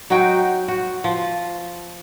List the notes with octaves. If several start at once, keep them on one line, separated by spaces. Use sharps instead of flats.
F#3 D#4 F#4 G5
F#4
F3